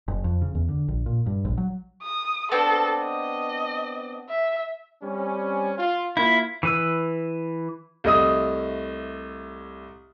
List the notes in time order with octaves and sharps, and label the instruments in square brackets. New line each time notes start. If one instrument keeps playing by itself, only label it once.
[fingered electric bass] F#1
F2
C#3
E2
D3
A#1
A#2
G2
A#1
F#3
[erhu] D#6
[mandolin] B3 C4 D4 [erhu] A4
[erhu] D#5
E5
[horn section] G3 C4 C#4
F4
[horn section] A#3 F4 [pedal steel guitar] E4
[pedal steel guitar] E3 B4 E6
[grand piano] C2 A3 D#5 D#6